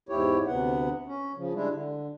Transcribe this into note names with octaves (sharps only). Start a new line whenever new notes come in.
E2 G#2 E4 G4 C#5
D2 C3 B3 F#5
C#4
C#3 F3
G3 G#3 D4 E4
D3